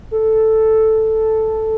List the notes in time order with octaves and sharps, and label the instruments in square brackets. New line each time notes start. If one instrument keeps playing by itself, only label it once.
[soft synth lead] A4